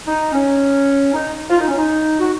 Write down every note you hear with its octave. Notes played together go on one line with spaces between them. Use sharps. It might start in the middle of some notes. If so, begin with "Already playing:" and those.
D#4
C#4
D#4
F4
D#4
C#4
D#4
F#4